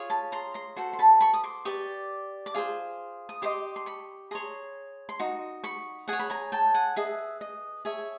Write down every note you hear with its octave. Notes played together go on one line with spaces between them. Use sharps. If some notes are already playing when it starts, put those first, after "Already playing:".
Already playing: F4 G#4 C#5
A5 B5
A#5 C6
A#5 C6
F#4 A4 C5 C6
C6
A5 B5
B5 C#6
D#6
C6 D6
G4 B4 D5 C#6 D#6
D6
F4 G#4 C5
D#6
G4 C5 D#5 C6 D6
C6
B5 C#6
G#4 C#5 A#5 C6
C6
D#4 F#4
B5 C#6
G#4 C#5 F#5 G#5
B5
G#5 A#5
G5 A5
F#5 G#5
G#4 B4 D#5 E5
D#5
G#4 C#5 E5